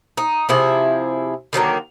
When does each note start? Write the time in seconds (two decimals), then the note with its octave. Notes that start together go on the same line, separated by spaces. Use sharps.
0.17 D#4
0.49 C3 F3 E4 G#4
1.53 D3 D#3 F#3 A#3